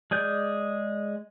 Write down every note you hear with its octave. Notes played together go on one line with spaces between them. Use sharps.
G#3 G#4 D5 G6